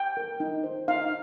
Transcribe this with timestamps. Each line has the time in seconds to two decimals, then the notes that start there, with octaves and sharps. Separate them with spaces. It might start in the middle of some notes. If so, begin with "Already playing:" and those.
Already playing: G5
0.17 A#4
0.40 D#4
0.64 C5
0.88 D#4 F5